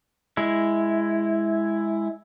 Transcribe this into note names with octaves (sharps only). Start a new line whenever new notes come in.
G#3 E4